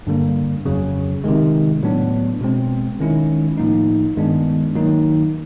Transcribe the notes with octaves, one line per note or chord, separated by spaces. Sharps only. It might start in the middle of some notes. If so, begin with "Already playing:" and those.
G2 D3 G3 A#3
F2 C#3 F#3
C3 D#3 G#3
A2 F#3 B3 D4
B2 G#3 C4
D#3 G#3 C#4 E4
A2 F3 A#3 D#4
G2 D#3 G#3 B3 D4
D#3 F#3 A#3 D#4